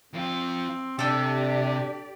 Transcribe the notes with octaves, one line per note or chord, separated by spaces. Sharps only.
F2 C4 F4
C3 D4 G4 A4 D5 G5